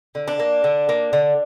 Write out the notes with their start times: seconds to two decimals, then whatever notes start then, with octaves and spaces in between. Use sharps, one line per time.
0.15 D3
0.28 D4
0.39 A#3
0.64 D3
0.89 A#3
1.13 D3